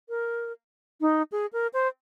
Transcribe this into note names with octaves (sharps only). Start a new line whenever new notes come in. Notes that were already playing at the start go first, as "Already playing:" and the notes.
A#4
D#4
G#4
A#4
C5